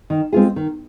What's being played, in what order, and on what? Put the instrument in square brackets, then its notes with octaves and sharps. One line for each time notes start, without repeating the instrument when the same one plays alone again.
[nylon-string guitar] D#3
G#3 C4 F4 G#4
D#3